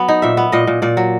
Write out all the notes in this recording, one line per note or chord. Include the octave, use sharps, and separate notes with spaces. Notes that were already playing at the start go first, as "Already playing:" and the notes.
Already playing: F#3 B3
D#4
A#2 E5
B3
A#2 D#5
A#2
A#2 D5
F#3